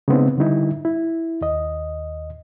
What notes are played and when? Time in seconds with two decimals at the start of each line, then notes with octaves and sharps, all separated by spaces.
0.08 C#3 G#3 B3 C4 D#4
0.38 D3 G3 D#4 E4
0.85 E4
1.41 D#2 D#5